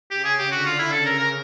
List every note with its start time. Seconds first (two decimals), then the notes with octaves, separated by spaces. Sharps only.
0.11 C#3 G4
0.24 G#4
0.39 G4
0.51 D3 F#4
0.66 F4
0.79 E4
0.92 C#3 A4
1.05 A#4
1.19 A#4